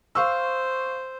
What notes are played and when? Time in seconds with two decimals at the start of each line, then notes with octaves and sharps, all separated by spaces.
0.15 C5 F5 C#6 E6